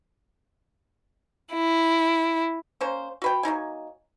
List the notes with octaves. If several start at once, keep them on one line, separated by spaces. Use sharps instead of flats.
E4
A#3 C#4 C5
F#4 B4 G5
F#3 A#3 D#4 G#5